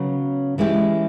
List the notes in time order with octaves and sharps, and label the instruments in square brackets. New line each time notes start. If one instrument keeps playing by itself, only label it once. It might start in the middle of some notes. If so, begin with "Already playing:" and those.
Already playing: [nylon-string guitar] C#3 F#3 B3
E3 G#3 C#4 E4 G4